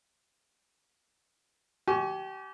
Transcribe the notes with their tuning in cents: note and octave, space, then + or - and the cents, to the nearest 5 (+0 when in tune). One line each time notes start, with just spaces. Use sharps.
G4 -30 G#5 +25 C#6 +0